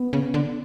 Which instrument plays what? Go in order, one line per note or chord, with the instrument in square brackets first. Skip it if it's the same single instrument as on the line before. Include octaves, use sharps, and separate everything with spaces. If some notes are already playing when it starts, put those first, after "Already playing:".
Already playing: [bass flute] B3
[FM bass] C#3
D3